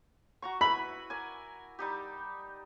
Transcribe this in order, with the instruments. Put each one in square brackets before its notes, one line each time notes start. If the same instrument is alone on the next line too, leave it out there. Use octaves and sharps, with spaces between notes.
[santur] F#4 A#5 C#6
[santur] E4 B4 [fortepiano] B5
[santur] A#4 D5 G#5
G3 D#4 G4